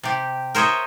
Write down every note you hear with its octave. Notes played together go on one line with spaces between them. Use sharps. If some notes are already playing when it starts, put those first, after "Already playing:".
C3 G4
A#4 C5 C#5 D#5 E5